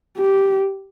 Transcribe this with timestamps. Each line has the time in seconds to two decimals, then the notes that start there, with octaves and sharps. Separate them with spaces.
0.18 G4